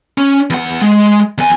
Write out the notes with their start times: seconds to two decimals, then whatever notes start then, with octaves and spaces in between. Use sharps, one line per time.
0.18 C#4
0.50 E2 F#5
0.82 G#3
1.38 E2 G#5